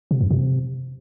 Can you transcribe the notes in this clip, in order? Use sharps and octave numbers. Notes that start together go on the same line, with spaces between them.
C3
F#2
C3